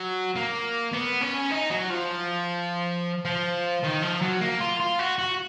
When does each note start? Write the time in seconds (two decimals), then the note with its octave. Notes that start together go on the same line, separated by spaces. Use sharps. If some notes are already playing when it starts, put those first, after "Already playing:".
Already playing: F#3
0.36 A#3
0.93 B3
1.22 C#4
1.52 D#4
1.71 F#3
1.90 F3
3.25 F3
3.83 D#3
4.02 F3
4.22 F#3
4.41 A#3
4.60 F4
4.80 F4
4.99 F#4
5.18 F#4